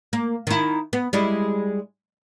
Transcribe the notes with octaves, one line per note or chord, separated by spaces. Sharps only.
A#3
D#3 E4
B3
G3 G#3 E4